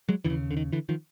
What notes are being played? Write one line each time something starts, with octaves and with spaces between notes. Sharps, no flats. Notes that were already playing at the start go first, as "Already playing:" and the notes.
F#3 G#3
D#2 D3 E3
C#3
D3
D#3
D3 E3
D#3 F3